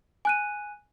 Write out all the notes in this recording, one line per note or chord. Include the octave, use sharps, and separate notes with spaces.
G#5 F#6 D#7